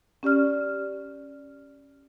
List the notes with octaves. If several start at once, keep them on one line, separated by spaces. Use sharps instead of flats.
C#4 G4 D5 F6